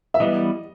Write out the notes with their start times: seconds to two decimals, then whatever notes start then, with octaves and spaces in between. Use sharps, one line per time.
0.14 E5
0.20 E3 G3 B3 D#5